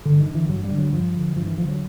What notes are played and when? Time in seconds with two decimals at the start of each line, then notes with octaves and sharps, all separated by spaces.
0.05 G2 D3
0.20 D#3
0.27 D3
0.35 E3
0.49 G2 F#3
0.64 G3
0.71 D3
0.78 F#3
0.93 G2 F3
1.14 D3
1.36 G2 F3
1.46 E3
1.57 D3 F3
1.69 F#3